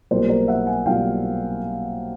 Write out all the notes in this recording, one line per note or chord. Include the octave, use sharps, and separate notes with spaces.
B1 A#2 G3 A#3 A#4 C5
A#4 C5
E5 F#5
F#5 G#5
B1 A#2 G3 A#3 F5 G5